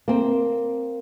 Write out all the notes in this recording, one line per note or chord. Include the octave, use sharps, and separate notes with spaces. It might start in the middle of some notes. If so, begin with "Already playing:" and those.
A#3 C4